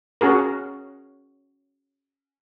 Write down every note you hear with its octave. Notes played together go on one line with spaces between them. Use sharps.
C#4 F#4 G#4 A#4